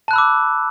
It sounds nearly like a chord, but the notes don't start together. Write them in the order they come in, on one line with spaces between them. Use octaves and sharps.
A5 F#6 B5 E6 D6